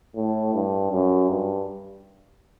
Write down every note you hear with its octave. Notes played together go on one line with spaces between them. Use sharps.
A2
G2
F#2
G2